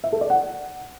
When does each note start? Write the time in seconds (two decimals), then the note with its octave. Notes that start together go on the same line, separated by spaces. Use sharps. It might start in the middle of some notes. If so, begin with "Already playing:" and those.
0.04 E5
0.12 A4
0.21 D5
0.30 F#5